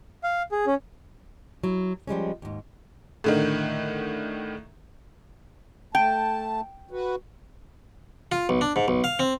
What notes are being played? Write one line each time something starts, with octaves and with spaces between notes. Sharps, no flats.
F5
G#4
C#4
F#3 E4
F3 G3 G#3 C#4
D#2 G#2
A2 D3 D#3
A3 G5 A5
F#4 B4
F4
B1
D4
G#2
B1
F5
C4